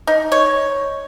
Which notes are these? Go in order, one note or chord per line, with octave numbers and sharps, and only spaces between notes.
D#4
C#5